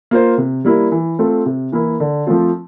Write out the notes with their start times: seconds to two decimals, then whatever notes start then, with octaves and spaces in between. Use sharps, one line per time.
0.11 A#3 F4 C5
0.38 C3
0.65 G3 A#3 E4
0.92 E3
1.19 A3 C4 F4 A4
1.46 C3
1.72 E3 A#3 E4
2.00 D3
2.27 F3 A3 C4 F4